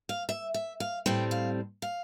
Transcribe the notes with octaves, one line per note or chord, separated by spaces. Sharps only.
F5
E5
E5
F5
A2 G3 C4 G5
F5
F5